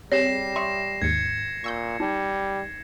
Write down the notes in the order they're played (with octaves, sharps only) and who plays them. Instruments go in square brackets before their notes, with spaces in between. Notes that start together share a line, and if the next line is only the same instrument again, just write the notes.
[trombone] G3 [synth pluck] C4 G4 G#4 [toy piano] C#5 [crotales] A#6 C7 E7
[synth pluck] E5 C#6 D#6 [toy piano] C6
[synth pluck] D#2 G#2 [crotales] G#6 C#7
[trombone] A#2 [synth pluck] C#6 E6 G6
[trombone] G3 [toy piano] D#4